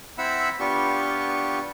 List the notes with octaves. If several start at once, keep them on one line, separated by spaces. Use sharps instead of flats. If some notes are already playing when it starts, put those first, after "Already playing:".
C4 E4 E5 F#5 B5 E6
B3 D4 F4 G4 C#6